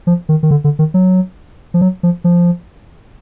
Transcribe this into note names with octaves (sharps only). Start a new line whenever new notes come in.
F3
D#3
D#3
D3
D3
D#3
F#3
F3
F#3
F3
F3